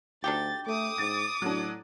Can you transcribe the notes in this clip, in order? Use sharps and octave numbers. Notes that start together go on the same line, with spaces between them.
D2 D4 D#4 G4 A6
A3 D6 D#6
G#2 A6
A2 F#3 D4